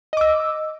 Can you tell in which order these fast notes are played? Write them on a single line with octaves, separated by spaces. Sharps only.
D#5 D6 E6